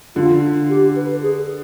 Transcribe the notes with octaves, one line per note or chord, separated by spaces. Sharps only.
D3 F4
G4
B4
G#4